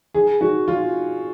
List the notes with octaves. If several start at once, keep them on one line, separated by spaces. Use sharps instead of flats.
G#4
F#4
F4